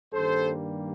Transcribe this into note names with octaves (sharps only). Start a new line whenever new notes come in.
G2 D#3 G3 A#3 A4 C5